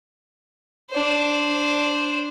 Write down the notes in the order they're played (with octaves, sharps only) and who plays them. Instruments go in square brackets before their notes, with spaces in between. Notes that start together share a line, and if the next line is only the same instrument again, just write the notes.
[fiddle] D4 C5